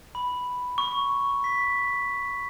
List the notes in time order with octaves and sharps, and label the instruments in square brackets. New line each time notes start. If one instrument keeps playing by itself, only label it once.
[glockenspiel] B5
C#6
B6